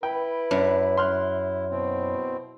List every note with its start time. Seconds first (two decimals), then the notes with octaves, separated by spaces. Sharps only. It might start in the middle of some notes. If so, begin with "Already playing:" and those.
0.03 E4 B4 G5
0.51 F#2 D4
0.97 C6 F6 F#6
1.71 B2 C4 E4